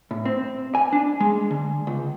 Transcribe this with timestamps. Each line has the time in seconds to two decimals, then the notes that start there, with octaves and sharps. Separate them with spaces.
0.11 A2
0.25 C4
0.75 G#5
0.92 D4
1.20 G#3
1.51 D3
1.87 C#2